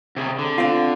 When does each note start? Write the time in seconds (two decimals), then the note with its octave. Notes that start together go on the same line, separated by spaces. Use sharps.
0.16 C3 G#4
0.39 D3
0.58 C4 F4